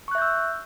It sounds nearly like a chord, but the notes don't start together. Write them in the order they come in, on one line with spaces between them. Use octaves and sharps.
C#6 F#6 E5 G6 E6